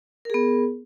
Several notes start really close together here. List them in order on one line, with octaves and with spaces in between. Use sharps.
A#4 G#4 B3